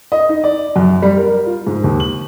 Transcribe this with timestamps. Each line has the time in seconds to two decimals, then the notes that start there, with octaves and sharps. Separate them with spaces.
0.12 D#5
0.29 D#4
0.44 D5
0.76 F#2
1.02 G3
1.16 A#4
1.46 F4
1.67 G#2
1.84 D#2
2.00 F#7